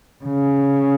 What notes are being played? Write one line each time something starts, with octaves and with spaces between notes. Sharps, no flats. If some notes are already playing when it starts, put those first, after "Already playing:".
C#3